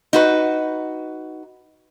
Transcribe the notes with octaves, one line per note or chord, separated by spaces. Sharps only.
D#4 F#4 B4